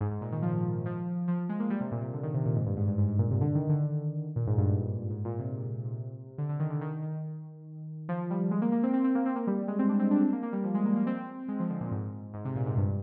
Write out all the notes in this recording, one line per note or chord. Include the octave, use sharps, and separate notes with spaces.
G#2
G#2
A#2
D#3
F3
F3
F3
F3
G#3
A#3
G3
C3
A#2
C3
D3
D#3
C3
A#2
G#2
G2
G#2
G2
G#2
G#2
A#2
C3
D3
D#3
D3
A#2
G#2
G2
G2
G#2
A#2
C3
D3
D3
D#3
D3
D#3
D#3
F3
G3
G#3
A#3
A#3
C4
C4
C4
A#3
C4
A#3
G3
G#3
C4
D4
C4
D4
C4
A#3
A#3
G3
F3
G#3
A#3
A#3
C4
G#3
F3
D3
A#2
G#2
G#2
C3
A#2
G#2
G2